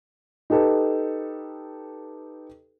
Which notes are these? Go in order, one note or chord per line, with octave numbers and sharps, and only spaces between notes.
D#4 G4 A4 B4